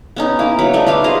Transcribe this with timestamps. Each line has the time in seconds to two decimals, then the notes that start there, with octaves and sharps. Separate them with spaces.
0.16 B3 C#4 D#4
0.39 A#3 E4
0.59 F#3 B4
0.73 G3 A3 D#4
0.86 F4 G4 B4 F5
1.04 G#4 C5 D#5 F5